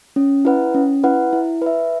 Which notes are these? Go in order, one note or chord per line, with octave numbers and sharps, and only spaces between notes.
C#4
E4 B4 F#5
C#4
E4 B4 F#5
E4
B4 E5